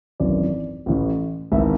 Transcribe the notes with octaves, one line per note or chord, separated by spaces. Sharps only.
G#1 F#2 E3 D5
A1 A2 E3
G#1 G#2 E3 E5